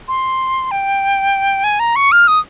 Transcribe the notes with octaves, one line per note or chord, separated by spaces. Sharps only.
C6
G5
G#5
A#5
C#6
F6
D#6